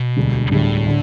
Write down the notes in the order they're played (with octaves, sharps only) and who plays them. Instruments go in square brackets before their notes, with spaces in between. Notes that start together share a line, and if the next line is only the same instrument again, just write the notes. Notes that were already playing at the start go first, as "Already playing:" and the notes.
Already playing: [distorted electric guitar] B2
[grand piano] E1 D2 D3 G3
[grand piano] E1 D2 D3 G3 [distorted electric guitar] A2
[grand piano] D3